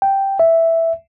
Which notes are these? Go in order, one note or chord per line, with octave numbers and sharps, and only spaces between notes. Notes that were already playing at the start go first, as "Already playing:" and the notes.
G5
E5